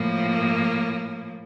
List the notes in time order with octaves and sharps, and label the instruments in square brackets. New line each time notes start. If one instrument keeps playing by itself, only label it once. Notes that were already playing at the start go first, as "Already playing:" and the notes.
Already playing: [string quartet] A2 F3 A#3